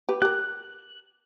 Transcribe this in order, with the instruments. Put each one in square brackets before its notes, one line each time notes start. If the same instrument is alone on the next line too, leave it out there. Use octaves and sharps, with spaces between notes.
[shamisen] G4 B4
[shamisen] G4 A#4 [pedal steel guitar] F#6